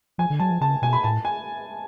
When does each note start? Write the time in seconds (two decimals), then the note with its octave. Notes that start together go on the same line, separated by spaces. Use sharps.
0.18 F3 G#5
0.30 D3
0.40 F#3 A5
0.51 F3
0.61 C#3 A5
0.82 B2 G#5
0.93 B5
1.04 A2 A5
1.25 G#5